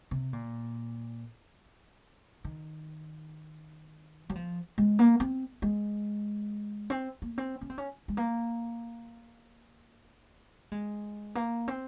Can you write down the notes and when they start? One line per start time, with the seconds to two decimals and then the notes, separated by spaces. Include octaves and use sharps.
0.11 C3
0.33 A#2
2.44 D#3
4.29 F#3
4.35 F3
4.78 G#3
4.99 A#3
5.20 C4
5.62 G#3
6.90 C4
7.22 A#3
7.38 C4
7.61 C#4
7.70 C4
7.78 C#4
8.08 G#3
8.17 A#3
10.72 G#3
11.35 A#3
11.68 C4